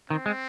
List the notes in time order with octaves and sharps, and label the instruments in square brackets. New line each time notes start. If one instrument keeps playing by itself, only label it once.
[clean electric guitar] D#3 [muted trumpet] C4
[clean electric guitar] G#3